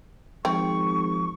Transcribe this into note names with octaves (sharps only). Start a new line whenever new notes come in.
G#1 F3 C4 C#6